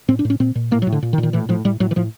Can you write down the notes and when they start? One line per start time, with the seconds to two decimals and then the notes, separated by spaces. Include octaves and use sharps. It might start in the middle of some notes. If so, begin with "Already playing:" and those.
0.08 A2 C4
0.19 D4
0.25 A2
0.30 C#4
0.40 A#2 C4
0.55 A#2
0.71 A2 A#3
0.82 F#3
0.87 A2
0.92 D3
1.02 A#2
1.13 D#3
1.18 A#2
1.23 D#3
1.33 A2 E3
1.49 A2 F3
1.65 A2 G3
1.80 A2 F#3
1.91 E3
1.96 A2 F3